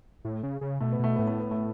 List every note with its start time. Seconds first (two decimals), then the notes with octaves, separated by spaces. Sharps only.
0.25 A2
0.43 C#3
0.61 C#3
0.80 B2 A3
0.93 B3
0.99 B2 A3
1.16 A2 B3
1.27 A3
1.40 B3
1.51 A3